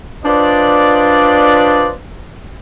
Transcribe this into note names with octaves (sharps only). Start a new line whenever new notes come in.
D4 F4 B4 C5 D5 D#5